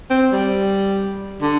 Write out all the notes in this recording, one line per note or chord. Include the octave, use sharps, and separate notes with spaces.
C4
G3
D3